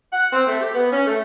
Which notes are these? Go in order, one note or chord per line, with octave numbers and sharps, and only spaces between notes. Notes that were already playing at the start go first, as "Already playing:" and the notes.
F#5
C4
A3
G4
B3
C#4
A3